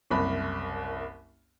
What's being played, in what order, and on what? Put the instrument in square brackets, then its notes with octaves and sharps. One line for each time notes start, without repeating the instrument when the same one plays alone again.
[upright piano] F#1 C2 B5